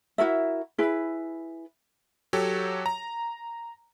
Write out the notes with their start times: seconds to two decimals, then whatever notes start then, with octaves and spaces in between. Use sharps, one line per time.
0.18 E4 F#4 A#4 E5
0.78 E4 G#4 B4
2.33 F#3 G4 A4 C#5
2.86 A#5